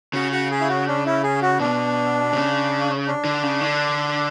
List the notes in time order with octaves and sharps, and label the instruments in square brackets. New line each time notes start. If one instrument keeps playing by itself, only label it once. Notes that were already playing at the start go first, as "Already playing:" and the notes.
[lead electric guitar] C#3 [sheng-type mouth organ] F#4 F#5
[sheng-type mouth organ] F#4 F#5
G#4
E4
F#4
D4
E4
G#4
F#4
[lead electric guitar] B2 [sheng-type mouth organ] D4
[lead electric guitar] C#3
[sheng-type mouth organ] D4
[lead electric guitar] D3
C#3
D3